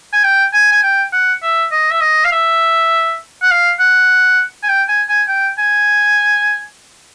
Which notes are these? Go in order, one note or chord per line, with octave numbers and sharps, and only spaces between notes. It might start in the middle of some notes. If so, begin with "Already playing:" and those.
G#5
G5
G#5
G#5
G5
F#5
E5
D#5
E5
D#5
F5
E5
F#5
F5
F#5
G#5
G5
G#5
G#5
G5
G#5